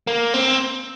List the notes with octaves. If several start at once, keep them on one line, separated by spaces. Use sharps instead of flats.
A#3
C4